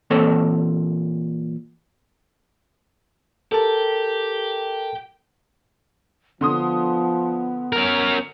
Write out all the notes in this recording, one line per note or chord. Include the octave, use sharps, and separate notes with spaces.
A#2 E3 C4 A4 C#5 A5
G4 A4 A#4 A5
D3 F3 B3 C6 D#6
C#4 A#4